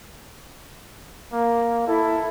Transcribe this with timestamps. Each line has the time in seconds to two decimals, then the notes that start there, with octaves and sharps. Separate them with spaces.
1.32 A#3
1.87 E4 A4